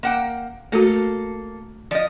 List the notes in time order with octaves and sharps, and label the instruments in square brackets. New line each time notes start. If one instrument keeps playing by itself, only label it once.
[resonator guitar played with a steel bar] A#3 F#5 G5
[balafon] A3 F#4 [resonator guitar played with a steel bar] A#3 A4
[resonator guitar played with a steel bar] F3 D#5 [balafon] D5